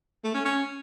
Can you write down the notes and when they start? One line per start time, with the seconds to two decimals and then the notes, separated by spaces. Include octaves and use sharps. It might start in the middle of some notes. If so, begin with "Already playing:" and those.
0.24 A3
0.35 C#4
0.45 C#4